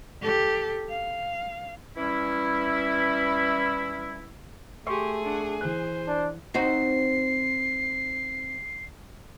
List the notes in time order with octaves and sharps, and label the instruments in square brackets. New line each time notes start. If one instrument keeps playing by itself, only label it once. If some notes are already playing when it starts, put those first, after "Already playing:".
[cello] G4 A4
F5
[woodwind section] E3 G3 C#4 E4
[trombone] A3 [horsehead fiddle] G4 [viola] G#4 G#5 [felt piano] C6 C#6 C7
[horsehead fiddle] D4 F#5
[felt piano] E3 F#6 [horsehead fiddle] C5
[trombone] D4
[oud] C4 D#4 F#4 [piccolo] C7